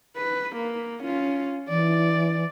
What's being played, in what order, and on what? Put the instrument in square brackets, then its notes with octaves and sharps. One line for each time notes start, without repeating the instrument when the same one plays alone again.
[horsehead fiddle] B4
A#3
C#4 F4
[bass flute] E3 [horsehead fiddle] D5